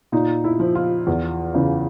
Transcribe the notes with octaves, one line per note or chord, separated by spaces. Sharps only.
A#2 D#4
E4
F3
F4
E2
C#3 E3